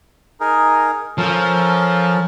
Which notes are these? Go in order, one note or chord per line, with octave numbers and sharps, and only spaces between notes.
D#4 G#4 A#4
F3 C#4 A4 A#4